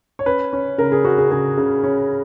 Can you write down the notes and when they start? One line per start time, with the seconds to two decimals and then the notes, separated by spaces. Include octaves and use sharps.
0.19 C#5
0.26 C#4 B4
0.53 C#4
0.78 C#3 A#4
0.92 G#4
1.04 C#3 F#4
1.18 G#4
1.31 C#3 G#4
1.57 C#3
1.84 C#4